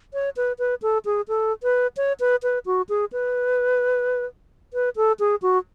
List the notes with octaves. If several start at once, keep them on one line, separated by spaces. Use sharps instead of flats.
C#5
B4
B4
A4
G#4
A4
B4
C#5
B4
B4
F#4
G#4
B4
B4
A4
G#4
F#4